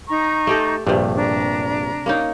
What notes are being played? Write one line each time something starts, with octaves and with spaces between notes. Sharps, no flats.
D#4 A#5 C#6
A3 G4 A4
A#1 G2 C3 A3
D4 A#5
A#3 C#4 D#4